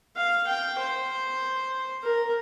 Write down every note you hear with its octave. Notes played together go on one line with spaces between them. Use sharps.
F5
G5
C5
A#4